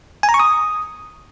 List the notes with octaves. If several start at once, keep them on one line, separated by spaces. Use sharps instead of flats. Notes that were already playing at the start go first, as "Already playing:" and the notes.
G#5
A#5
C#6
D#6